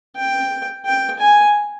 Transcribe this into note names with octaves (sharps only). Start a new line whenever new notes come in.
G5
G5
G#5